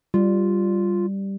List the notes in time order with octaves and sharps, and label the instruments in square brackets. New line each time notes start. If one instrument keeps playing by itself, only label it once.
[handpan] G3 [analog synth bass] F4